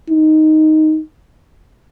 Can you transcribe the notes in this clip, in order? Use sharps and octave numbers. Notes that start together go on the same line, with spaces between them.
D#4